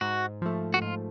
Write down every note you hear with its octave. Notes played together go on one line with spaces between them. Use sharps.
G#2 F#4
F3 A3
F#4
G#2 F4